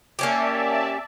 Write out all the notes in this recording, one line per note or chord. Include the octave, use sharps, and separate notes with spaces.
A#3 C#4 G4 D5 E5 A5